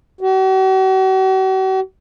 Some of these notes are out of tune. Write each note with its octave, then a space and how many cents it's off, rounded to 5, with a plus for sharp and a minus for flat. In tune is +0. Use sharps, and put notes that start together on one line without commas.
F#4 +45